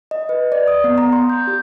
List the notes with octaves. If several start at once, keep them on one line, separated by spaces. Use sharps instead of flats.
D#5
B4
D5
D#6
B3
A#5
C6
G6
G4